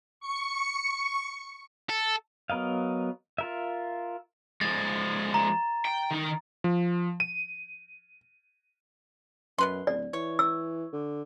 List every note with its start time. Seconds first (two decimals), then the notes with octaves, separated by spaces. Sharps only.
0.20 C#6 C#7
1.89 A4
2.50 F#3 B3 A#4 D#5 F5
3.38 F4 A#4 E5
4.61 F3 G#3 A6
5.34 A#5
5.85 G5
6.11 D#3 D#4
6.64 F3
7.20 D#7
9.58 F#2 B2 B4 C6
9.87 D1 D5
10.13 E3 C#5
10.39 E6
10.93 D3